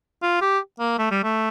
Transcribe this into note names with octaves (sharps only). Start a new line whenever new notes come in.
F4
G4
A#3
A3
G3
A3